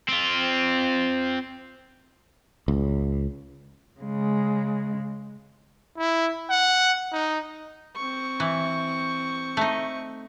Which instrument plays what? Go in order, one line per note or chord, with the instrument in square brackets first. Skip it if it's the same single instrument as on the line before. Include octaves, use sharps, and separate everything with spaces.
[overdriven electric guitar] C4 F4
[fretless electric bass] C#2
[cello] C#3 G#3
[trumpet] E4
F#5
D#4
[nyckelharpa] C4 C#6
[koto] E3
A3 D#4